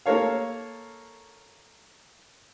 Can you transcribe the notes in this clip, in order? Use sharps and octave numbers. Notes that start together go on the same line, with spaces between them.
A#3 A4 A#4 C#5 F5